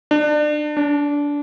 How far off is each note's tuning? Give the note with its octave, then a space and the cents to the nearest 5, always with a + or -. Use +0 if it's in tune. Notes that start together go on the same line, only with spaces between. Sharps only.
D4 +30
D4 -20